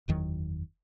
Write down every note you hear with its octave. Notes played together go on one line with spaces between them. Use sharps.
F#1 E2 D#3 F#3